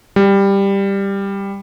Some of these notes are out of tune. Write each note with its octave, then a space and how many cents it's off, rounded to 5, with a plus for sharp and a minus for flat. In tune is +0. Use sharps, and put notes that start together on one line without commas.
G3 +10